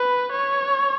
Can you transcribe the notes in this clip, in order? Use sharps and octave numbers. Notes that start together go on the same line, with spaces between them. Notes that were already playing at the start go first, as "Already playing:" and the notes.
Already playing: B4
C#5